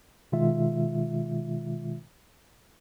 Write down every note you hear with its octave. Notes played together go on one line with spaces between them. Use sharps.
B2 D#3 G#3 F4 E5